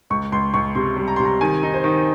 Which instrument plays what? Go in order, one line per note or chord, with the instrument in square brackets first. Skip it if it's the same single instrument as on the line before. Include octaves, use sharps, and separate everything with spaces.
[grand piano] C#2 C#6
C#2 C6
C#2 C#6
C3 C6
G3
A#5
C3 C6
A#5
D#3 G#5
D#4
C5
D#3